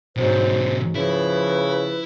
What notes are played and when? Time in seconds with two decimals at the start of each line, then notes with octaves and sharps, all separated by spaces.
0.16 G#2 B2 D3 F#3 C5
0.95 C#3 F3 E4 B4